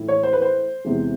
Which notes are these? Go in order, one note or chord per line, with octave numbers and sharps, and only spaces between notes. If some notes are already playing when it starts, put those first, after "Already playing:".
Already playing: A2 E3 A3
C#5
C5
B4
C5
E2 C3 E3 G#3